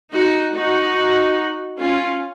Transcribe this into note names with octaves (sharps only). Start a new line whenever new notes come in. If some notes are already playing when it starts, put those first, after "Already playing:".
D#4 F#4
D#4 F#4
C#4 F4